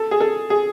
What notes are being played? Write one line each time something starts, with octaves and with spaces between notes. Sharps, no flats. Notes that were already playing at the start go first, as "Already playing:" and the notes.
Already playing: A4
G#4
A4
G#4